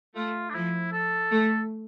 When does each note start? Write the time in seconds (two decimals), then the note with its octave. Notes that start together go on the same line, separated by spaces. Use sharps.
0.15 A3 F4
0.50 D4
0.54 F3 E4
0.92 A4
1.31 A3